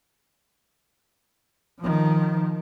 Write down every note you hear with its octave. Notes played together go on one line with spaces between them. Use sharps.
D#3 F3